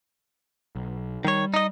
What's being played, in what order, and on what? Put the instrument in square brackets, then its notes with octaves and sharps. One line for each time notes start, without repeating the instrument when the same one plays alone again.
[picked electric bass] B1
[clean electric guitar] D#3 C#5 [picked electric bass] G3
[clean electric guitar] D#4 D#5